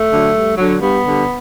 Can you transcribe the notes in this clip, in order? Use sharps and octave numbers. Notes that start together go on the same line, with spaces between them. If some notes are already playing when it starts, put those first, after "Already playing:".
Already playing: A3
D3 F#3
G2
D3 F#3
G2 B3
D3 G3